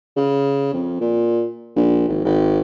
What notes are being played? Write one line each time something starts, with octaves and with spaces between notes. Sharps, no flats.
C#3
F2
A#2
A#1
G#1
G#1